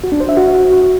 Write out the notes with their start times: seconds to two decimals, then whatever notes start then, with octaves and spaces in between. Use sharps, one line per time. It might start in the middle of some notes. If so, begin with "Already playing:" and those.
0.04 F#4
0.12 D4
0.20 C5
0.29 E5
0.37 F#4